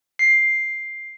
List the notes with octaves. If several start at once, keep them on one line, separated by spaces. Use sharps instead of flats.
C7